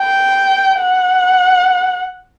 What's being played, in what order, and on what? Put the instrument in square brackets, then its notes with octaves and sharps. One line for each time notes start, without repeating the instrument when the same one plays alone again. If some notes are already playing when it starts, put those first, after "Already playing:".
Already playing: [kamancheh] G5
F#5